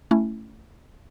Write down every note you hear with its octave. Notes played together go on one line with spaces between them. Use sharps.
A3 C#4 E4